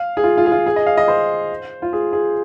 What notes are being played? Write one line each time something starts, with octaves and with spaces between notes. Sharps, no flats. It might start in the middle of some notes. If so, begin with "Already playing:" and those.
Already playing: F5
G#4
F4
F4
G#4
F4
G#4
D#5
F5
D#5
C5
F4
G#4
G#4